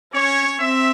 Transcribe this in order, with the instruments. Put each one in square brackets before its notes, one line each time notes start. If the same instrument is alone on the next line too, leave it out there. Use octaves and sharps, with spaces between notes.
[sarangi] C#4 [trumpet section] C#5
[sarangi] C4 [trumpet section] E5